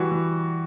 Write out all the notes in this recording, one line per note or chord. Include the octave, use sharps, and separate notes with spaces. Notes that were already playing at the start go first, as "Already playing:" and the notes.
Already playing: E3 G3 F#4
E3